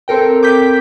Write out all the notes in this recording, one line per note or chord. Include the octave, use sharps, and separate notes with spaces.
C4 A4 A#4 G5
D6 G6 B6